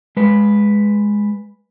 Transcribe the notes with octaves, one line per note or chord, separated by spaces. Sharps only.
G#3 B4